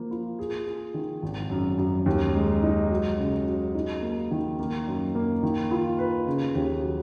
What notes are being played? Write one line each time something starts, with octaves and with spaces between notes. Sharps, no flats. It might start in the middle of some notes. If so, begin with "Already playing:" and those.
Already playing: F3 A#3
F4
G#4
G#4
D#3
G#1
F#2
F#2
D#2
G#3
D#4
F#3
C#3
F#3
D#4
A#3
D#3
A#3
F#2
A#3
D#3
F4
B4
C#3
D#2
F#3